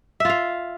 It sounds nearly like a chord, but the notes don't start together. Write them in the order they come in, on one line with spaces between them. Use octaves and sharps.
E5 F4 F5